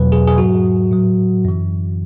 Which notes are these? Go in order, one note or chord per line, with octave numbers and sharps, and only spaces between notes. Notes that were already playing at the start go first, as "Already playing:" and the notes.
Already playing: E2 B2 F#3 B4
G#4
G#4
G#2 F#3 F#4
A2 F#3
F#2 E3